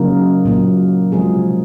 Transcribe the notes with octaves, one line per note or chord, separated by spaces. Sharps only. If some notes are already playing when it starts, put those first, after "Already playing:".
Already playing: C#3 F#3 A#3 D#4
A#2 F#3 A#3
C3 F3 G#3 G#4